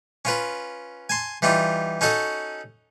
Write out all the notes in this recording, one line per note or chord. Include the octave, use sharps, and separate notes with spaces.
C#4 F4 B4
G#5 A5 C6
E3 G3 D#4 F4
C#4 D#4 F#4 A4 D#5